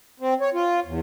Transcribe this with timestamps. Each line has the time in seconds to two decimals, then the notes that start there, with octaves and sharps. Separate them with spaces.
0.20 C4
0.41 C#5
0.54 F4
0.85 E2